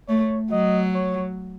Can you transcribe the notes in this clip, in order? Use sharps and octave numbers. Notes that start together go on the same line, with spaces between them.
A3 C#5
F#3 D#5
C#5